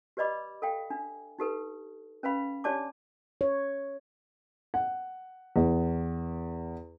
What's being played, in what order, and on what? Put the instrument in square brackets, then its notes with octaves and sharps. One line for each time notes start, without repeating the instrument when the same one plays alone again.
[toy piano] G4 B4 D5 D#5 B5 D6
A4 F5 G5
D4
D#4 G4 A4 B4
C#4 B4 F5 B5
D4 G4 C#5 D5 A5 D6
[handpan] C#5
[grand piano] F#5
E2